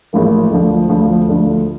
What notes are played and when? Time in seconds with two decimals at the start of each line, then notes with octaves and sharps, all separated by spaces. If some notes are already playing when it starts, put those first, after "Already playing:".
0.13 A1 G#2 F3 A#3
0.51 D2 D3 F3
0.89 D2 D3 F3
1.28 D2 D3 F3